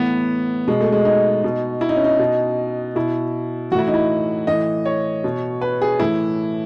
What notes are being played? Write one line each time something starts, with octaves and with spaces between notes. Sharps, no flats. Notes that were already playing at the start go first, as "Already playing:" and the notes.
Already playing: A2 E3 B3
B2 G#3
A3
G#3
D#4
B2
E4
D#4
C#4
D#4
B2
B2 E4
A2 E3 E4 F#4
D#4
E4
A2 E3 D#5
C#5
B2
B4
G#4
A2 E3 E4